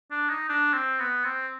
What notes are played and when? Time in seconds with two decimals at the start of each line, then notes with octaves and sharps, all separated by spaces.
0.11 D4
0.29 D#4
0.49 D4
0.73 C4
0.99 B3
1.24 C4